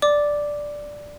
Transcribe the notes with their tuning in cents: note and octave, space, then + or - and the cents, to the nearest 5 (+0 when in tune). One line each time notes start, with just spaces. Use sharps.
D5 +0 D6 +0